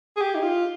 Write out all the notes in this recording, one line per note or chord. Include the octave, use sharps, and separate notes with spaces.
G#4
G4
D#4
F4